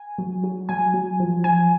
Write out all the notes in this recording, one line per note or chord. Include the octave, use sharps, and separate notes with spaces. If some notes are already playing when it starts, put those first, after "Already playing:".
Already playing: G#5
F#3
F#3
F#3 G#5
F#3
F3
F3 G#5